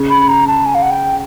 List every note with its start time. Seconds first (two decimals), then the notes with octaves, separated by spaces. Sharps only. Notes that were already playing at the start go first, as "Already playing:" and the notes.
Already playing: C#3
0.10 B5
0.28 A#5
0.47 A5
0.66 G#5
0.75 F5
0.82 F#5
0.90 G5